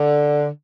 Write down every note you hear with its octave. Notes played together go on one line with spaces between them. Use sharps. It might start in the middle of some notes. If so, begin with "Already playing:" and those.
Already playing: D3